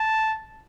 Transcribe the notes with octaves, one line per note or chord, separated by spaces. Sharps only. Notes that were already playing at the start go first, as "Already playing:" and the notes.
Already playing: A5